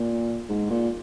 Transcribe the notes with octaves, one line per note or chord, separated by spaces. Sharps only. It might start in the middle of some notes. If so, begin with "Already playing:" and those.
Already playing: A#2
G#2
A#2